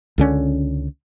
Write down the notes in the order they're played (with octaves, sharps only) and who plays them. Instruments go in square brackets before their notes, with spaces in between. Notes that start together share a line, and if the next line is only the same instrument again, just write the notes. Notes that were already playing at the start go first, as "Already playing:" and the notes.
[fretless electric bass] C#2 D3 C#4